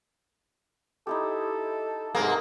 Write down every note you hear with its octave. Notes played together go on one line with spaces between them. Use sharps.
D#4 E4 G4 A4
G#2 C3 A#3 G#4 A#4 B4